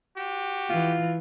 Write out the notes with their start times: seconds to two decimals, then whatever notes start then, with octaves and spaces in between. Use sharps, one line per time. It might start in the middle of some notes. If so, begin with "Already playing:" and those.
0.16 F#4 G4
0.69 E3 F4